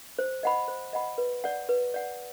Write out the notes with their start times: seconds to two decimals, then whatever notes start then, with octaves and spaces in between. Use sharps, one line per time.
0.19 C5
0.43 D#5 F#5 B5
0.68 C5
0.93 D#5 F#5 B5
1.18 B4
1.44 D5 F#5
1.69 B4
1.94 D5 F#5